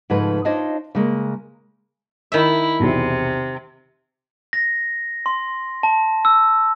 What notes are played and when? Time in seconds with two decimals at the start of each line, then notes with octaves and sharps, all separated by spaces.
0.10 G#2 C#3 F3 A3 B4
0.45 D4 D#4 F4 C5 C#5 D#5
0.95 C#3 G#3 A#3
2.32 D#3 E4 E5
2.80 B1 E2 C3
4.53 A#6
5.26 C6
5.83 A5
6.25 E6